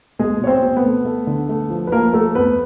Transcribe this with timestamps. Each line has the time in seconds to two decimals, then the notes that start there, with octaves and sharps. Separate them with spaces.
0.19 B2 G#3 G#4
0.41 B2 C#5
0.47 C4 C5
0.62 B2
0.77 B3 B4
0.83 A3
1.05 A3
1.27 D3
1.49 A3
1.70 F3
1.87 B4
1.92 F3 A#3 A#4
2.13 A3 A4
2.35 F2 B3 B4